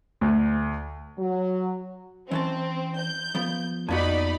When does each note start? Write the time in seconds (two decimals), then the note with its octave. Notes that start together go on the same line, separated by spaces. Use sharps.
0.21 D2
1.18 F#3
2.31 E3 C4 C#4 A5
2.98 G6
3.35 F3 B3
3.89 F2 A#3 B3 D#4 F#4 D5 A#5 B5